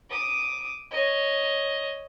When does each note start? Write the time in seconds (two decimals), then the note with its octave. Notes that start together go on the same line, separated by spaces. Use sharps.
0.10 D6 D#6
0.91 C#5 D#5